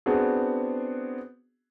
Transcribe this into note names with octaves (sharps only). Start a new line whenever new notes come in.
B3 C4 D4 F#4 G#4